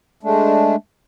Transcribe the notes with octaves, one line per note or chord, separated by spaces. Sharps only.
G#3 A3 D4